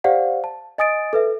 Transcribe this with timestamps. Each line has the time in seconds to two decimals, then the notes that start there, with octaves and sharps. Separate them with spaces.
0.04 G4 C5 D5 F5 F#5
0.44 A5
0.78 D#5 G#5 D#6 A6 D7
1.13 A4 B4 E5